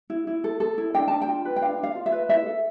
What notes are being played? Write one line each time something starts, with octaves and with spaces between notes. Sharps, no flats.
E4
E4
A4
A4
E4
D4 G5
D4 A5
G5
F4
B4
G5
D4 F5
D4
F5
F4
E5
B4
E4 E5
A4